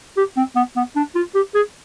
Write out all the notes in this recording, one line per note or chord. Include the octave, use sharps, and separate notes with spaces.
G4
C4
B3
B3
D4
F4
G4
G#4